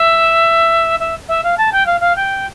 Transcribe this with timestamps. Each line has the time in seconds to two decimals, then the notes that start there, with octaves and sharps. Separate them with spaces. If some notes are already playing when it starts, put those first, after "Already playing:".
Already playing: E5
0.99 E5
1.28 E5
1.43 F5
1.57 A5
1.72 G5
1.86 F5
2.00 F5
2.15 G5